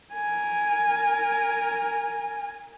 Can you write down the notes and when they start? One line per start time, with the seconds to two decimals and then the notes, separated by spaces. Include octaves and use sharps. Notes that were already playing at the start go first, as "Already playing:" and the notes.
0.13 A#4 G#5